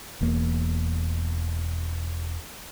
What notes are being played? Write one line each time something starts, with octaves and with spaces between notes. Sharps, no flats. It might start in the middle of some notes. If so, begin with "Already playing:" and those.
E1 E2 A#3